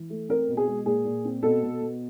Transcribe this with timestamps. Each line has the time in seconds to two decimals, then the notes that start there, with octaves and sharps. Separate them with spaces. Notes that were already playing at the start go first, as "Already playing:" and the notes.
Already playing: E3
0.10 A3
0.29 C4 A#4
0.48 B2
0.57 G#4
0.67 G#3
0.86 A#2 G#4
1.05 A#2
1.25 C4
1.43 B2 A4
1.63 B2
1.81 B3